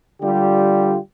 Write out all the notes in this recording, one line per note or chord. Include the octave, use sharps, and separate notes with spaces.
D3 G3 F4 G4